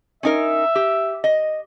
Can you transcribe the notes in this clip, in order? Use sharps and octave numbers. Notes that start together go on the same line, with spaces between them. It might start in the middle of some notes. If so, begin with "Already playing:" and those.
C#4 D#4 A#4 E5
G4
D#5